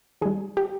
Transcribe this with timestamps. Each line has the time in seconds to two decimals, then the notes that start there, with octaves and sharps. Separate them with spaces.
0.21 D#3 G3 G#4
0.57 G4